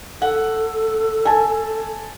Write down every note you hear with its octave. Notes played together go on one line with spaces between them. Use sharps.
A4 F#5
G#5 A5